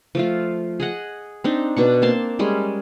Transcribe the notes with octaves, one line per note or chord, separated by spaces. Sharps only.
F3 A3 F4
G#4 D#5 F#5
C4 D4 D#4
B2 D4 C#6
A#3 C4 A5 C6
G3 G#3 C#4